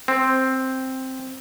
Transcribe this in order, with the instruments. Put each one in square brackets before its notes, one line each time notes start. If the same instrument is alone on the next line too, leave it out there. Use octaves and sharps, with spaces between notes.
[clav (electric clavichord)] C4